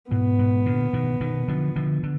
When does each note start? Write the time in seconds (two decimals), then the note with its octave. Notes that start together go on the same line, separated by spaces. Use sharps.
0.10 G#2 B2 B3
0.39 G#2 B2
0.66 A#2 D3
0.93 B2 D#3
1.20 B2 D#3
1.48 D3 F3
1.76 D3 F3
2.03 D3